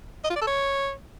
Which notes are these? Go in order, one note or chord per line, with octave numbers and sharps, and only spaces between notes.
D#5
F4
D5
A4
C#5